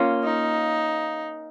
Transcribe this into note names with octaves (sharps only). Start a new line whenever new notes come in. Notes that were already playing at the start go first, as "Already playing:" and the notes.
Already playing: A#3 C#4 F4
D#4